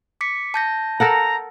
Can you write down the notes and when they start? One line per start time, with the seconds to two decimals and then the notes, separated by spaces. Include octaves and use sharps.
0.21 D6 B6 C#7
0.54 A5 G6 A#6
1.00 A4 A#4 F#5 A#5